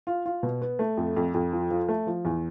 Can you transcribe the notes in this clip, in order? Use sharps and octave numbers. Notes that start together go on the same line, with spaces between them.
F4
F4
B2
B3
A3
F2
F2
F2
F3
F3
A3
F3
E2